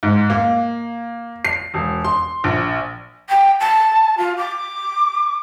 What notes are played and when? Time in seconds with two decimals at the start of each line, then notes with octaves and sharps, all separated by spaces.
0.03 G#2
0.30 A#3
1.45 C7
1.74 E1
2.04 C6
2.44 A#1
3.29 G5
3.60 A5
4.18 F4
4.37 D6